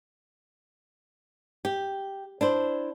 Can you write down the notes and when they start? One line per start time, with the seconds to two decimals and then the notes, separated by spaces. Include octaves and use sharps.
1.65 G4
2.41 D4 E4 C5